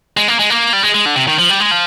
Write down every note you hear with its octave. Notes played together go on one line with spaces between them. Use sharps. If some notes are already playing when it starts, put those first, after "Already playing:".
G#3
A#3
G#3
A#3
G3
G#3
G#3
D3
C3
D#3
F3
G3
G#3
F3